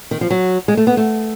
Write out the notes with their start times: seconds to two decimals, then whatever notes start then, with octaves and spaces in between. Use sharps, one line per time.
0.11 D#3
0.21 F3
0.31 F#3
0.68 G#3
0.77 A3
0.87 B3
0.97 A3